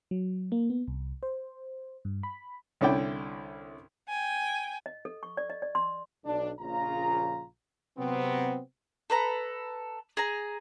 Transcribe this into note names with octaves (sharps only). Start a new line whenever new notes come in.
F#3
A#3
B3
C2
C5
G2
B5
C2 D3 C#4 E4 D5 G5
G5 G#5
D#5
A4
C#6
D5
D#5
D5
C6
B1 D4
A#1 C#3 F4 A#5
C3 F#3 B3 C4
A4 B4 A#5
G#4 A#5